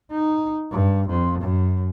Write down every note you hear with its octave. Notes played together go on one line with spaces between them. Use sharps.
D#4
G2
F2
F#2